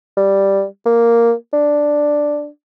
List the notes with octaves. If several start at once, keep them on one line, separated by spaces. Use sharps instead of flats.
G3
A#3
D4